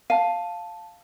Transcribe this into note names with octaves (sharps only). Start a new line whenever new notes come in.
F5 A5 D#7